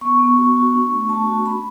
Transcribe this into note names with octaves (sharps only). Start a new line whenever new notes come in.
B3 C#6
B3
F#4
F#4
D4
A3
A3 A5
F#4
C#4 B5